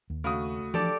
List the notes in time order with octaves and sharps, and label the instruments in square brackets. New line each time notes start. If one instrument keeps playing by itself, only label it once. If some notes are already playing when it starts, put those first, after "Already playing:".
[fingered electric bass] D#2
[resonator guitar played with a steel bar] C#3 [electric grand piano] A3 F#4 D#6
[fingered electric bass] E3 F3 D4 [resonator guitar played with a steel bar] G4 A4 D5